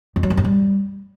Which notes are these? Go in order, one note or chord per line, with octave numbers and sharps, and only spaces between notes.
F2
F#3
F#2
G2
G3